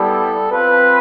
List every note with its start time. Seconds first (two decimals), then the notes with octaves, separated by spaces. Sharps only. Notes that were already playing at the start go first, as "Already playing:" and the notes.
Already playing: G3 B3 E4 G4 A4
0.52 C4 F4 B4